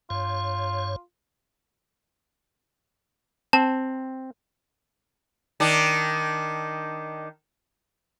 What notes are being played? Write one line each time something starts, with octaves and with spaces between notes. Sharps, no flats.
G2 F4 C#5
C4 A5
D#3 D4